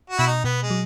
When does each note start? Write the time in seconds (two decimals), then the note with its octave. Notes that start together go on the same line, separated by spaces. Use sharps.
0.10 F#4
0.18 B2 E4
0.27 D#4
0.44 B2 B3
0.63 G#3
0.71 F#3